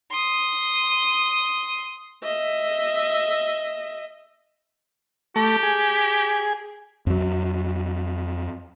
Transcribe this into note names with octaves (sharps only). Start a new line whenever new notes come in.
C6 D#6
D#5 E5
A3 G4
G#4
F2 F#3